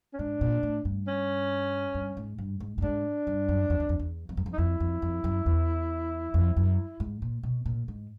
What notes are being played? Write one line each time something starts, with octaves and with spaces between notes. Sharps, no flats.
C#4
G#2 D4
A#2
A2
G2
C#4
G2
G#2
G2
G#2
A2
G#2 D4
G2
F#2
F2
E2
F2
E2
F2
F#2
F2
D#4
F2 E4
F2
F2
F#2
E2
F2
F#2
G#2
A#2
B2
A#2
G#2